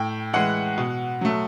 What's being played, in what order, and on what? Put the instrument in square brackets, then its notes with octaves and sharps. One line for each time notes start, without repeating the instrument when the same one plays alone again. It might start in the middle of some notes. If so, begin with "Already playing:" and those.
Already playing: [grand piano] A2 G5
E3 G#3 F#5
B2
F#3 A3